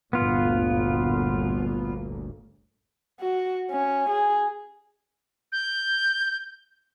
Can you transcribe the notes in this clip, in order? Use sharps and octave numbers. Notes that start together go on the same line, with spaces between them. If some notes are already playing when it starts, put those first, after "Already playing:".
G1 D2 A#2 B3 F4
F#4
C#4
G#4
G6